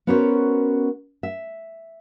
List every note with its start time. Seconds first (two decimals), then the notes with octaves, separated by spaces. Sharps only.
0.07 B3 C#4 F#4 A#4 C5 C#5
1.23 E5